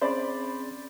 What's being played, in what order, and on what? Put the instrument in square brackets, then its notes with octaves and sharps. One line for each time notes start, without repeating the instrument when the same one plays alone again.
[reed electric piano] C4 C#4 G#4 [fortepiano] C5 D5 B5